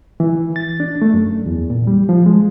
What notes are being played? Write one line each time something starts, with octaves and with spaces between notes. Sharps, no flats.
E3
A6
D4
A3
F#2
E2
A#2
G3
F3
G#3